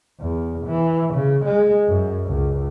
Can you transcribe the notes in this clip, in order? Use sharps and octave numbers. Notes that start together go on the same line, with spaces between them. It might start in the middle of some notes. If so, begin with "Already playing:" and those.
E2
E3
C#3
G#3
F#2
C#2